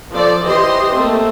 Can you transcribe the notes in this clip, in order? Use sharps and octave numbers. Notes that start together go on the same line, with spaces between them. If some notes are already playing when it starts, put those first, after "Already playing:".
F3 A4 D5
E3 G4 C5 D#5 C6
A3 A#3 C4